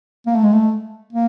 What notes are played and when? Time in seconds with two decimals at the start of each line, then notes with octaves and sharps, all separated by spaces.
0.27 A#3
0.36 A3
0.44 G#3
0.53 A3
1.13 A#3